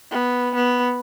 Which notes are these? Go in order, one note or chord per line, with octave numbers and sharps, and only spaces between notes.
B3
B3